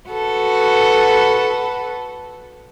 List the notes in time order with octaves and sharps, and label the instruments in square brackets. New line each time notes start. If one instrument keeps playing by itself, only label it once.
[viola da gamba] F#4 A4 B4